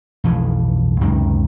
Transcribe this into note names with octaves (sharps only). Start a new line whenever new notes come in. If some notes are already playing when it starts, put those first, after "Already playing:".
B1 F2 E3 F3
C#2 F#2 C3 D#3